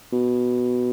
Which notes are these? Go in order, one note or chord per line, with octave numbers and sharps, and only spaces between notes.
B2